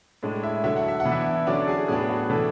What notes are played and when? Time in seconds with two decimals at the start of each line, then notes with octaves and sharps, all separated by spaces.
0.23 A2 G#3 D4
0.43 E4 E5
0.64 D3 F#3 A3 E5
0.77 F#5
0.88 E5
1.00 F#5
1.05 E3 B3 D4
1.12 E4 E5
1.47 D3 F#3 C#4 D4 D5
1.68 G#4
1.88 A2 F#3 B3 D4 G#4
2.09 F#4
2.30 A2 E3 A3 D4